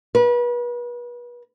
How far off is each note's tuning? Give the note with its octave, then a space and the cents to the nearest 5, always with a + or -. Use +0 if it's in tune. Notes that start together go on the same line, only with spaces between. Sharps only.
B4 -35